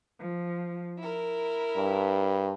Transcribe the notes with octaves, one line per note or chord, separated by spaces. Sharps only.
F3
E4 A#4
G2